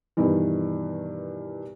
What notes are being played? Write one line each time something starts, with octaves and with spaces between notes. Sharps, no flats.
G2 B2 D#3 E3